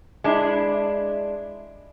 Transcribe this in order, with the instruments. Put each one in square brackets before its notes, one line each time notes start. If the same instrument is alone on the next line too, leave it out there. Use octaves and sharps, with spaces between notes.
[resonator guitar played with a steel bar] G#3 D4 E4